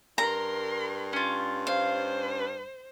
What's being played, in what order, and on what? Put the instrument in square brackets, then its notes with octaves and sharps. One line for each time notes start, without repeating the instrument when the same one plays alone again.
[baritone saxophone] G2 [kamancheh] A#4 C6 [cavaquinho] A#5
[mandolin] C#4 F4
[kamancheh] C5 [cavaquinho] F5